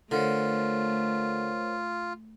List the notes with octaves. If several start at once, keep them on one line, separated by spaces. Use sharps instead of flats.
D3 A3 F4 A#4 C5 C#5